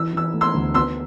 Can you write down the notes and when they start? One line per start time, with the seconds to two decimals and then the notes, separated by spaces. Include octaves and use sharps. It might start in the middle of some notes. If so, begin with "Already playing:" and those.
Already playing: E3 E6
0.13 E3 E6
0.34 A3
0.41 C6 E6
0.54 D2
0.74 B3 C6 E6